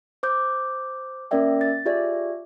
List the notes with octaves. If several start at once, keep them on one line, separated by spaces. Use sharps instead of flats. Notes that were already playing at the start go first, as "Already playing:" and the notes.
C5 D6 G6
A#3 C#4 A#4 D5 E5 G5
A6
F4 G4 G#4 D5 E5